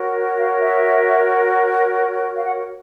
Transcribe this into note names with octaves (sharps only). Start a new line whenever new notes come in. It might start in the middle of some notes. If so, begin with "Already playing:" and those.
Already playing: F#4 A#4 C#5
F5
E5
F5
F#5